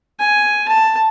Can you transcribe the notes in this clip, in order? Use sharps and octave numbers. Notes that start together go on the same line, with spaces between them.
G#5
A5